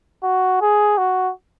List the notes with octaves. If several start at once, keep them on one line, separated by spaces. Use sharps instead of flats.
F#4
G#4
F#4